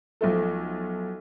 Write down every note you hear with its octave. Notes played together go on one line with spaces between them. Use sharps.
B1 F3 A3 A4